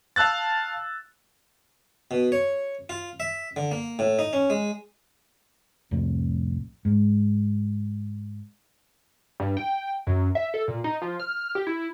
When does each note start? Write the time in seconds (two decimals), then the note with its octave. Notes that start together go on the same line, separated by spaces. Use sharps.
0.16 F5 A5 E6 F#6 A6
2.11 B2
2.32 C#5
2.89 F4
3.20 E5
3.56 D3
3.71 A#3
3.99 A2
4.19 D#4
4.33 C#4
4.50 G#3
5.91 C2 F2 A2
6.85 G#2
9.40 G2
9.57 G5
10.07 F#2
10.35 E5
10.54 A4
10.68 A#2
10.84 D#4
11.02 F3
11.20 F6
11.55 G4
11.67 E4